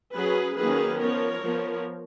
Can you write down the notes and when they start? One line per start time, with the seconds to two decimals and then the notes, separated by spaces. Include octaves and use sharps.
0.15 F#3 C#4 G#4 B4
0.58 D#3 F#3 A#3 C#4 G#4 B4
1.01 F3 B3 A#4 C#5
1.43 F3 B3